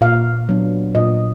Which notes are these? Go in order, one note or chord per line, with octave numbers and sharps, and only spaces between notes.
A#2 F5
F#3 B3 D4
A#2 D#5